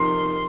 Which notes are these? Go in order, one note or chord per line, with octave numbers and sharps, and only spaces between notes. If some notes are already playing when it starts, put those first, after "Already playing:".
Already playing: F2 C3 D#3 C6